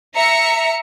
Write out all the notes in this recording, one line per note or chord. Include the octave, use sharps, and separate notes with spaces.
E5 A#5 C#7